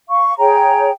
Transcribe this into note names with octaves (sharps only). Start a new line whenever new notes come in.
F5 C#6
G#4 C#5 G5 A#5